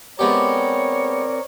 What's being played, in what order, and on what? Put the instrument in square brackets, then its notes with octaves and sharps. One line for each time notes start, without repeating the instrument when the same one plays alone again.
[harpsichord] G#3 B3 G4 [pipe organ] C4 A#4 [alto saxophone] C#5 [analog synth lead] D5